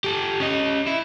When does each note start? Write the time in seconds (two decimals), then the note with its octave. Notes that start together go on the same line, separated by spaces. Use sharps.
0.04 G4 A4
0.40 C#4 D#5
0.87 E4